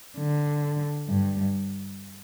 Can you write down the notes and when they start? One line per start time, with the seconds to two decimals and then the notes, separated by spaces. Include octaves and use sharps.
0.17 D3
1.08 G2